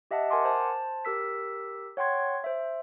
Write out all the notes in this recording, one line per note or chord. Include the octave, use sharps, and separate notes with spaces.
G4 D#5 E5 F#5 A5
A#4 F#5 G#5 A5 C6 D6
C5 A5
G4 A#4 E6 B6
C#5 F#5 G5 C6 G#6
C5 E5